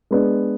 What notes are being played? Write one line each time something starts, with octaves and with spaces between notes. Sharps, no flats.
G#3 B3 D4